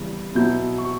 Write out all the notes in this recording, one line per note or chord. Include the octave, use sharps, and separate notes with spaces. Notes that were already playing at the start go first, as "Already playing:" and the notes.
Already playing: C#3 E3 G3 B3
B2 F#3 B3 E4 G6
C#6